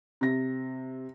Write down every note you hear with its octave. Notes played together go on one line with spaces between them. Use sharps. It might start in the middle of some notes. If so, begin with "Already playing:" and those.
C3 A#6